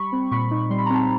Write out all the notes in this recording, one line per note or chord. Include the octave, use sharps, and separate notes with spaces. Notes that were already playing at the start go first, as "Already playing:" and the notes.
Already playing: G3 B5 C#6
C4
A#2 B5 C#6
D#4
G3 C6
B5
A#5
C4 A5 B5